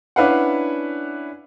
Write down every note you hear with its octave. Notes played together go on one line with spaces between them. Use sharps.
C#4 D4 E4 B4 F5 F#5